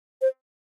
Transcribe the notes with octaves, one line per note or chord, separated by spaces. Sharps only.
C5